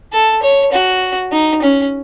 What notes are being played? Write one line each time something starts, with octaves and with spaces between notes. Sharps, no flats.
A4
C#5
F#4
D#4
C#4